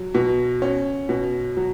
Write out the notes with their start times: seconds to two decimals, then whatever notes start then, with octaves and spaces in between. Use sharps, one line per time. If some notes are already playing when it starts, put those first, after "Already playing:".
Already playing: F#3
0.15 B2
0.62 C#4
1.09 B2
1.57 F#3